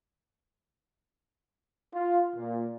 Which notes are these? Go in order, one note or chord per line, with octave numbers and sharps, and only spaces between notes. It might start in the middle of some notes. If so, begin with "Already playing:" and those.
F4
A#2